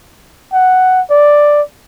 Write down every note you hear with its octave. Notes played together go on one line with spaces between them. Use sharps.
F#5
D5